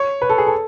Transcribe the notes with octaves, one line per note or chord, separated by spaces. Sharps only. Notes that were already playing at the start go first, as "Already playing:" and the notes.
Already playing: C#5
B4
A4
G#4
A4